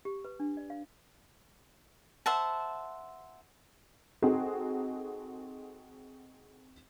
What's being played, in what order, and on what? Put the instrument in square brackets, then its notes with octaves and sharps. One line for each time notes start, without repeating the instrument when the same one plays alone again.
[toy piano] G4
B4
D4
D5
F5
[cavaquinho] C5 E5 F#5 A5
[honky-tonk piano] C4 D#4 F#4 G#4 A4